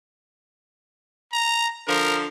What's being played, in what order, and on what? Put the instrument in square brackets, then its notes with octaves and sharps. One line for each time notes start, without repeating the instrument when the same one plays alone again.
[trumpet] A#5
[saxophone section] D3 F3 [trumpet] A#4